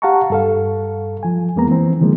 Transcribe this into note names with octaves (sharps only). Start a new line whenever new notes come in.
G4 F5 F#5 A5 A#5 C#6
G2 A4 F5
F3 G#5
F2 G#3 A#3 B3 A#5
E3 C4
D3 D#3 F3 G#3 A#3